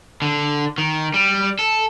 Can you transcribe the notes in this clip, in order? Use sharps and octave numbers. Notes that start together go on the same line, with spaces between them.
D3
D#3
G3
A4